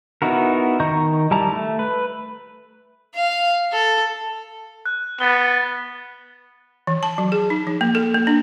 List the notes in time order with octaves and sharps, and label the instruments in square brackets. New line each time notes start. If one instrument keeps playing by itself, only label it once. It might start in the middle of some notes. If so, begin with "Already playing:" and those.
[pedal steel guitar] B3 D#4 E4 F#4 A#4
D#3 D#5 A#5 C#6 G6
G3 E4 A5 A#5
A3
B4
[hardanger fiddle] F5
A4
[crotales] F#6
[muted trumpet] B3 [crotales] A6 G7
[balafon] E3
A5
F#3
G#4
D#4
F3
A#3
A4
A#3
D4